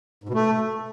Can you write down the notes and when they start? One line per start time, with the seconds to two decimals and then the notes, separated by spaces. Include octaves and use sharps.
0.24 G#2
0.29 B2
0.34 A3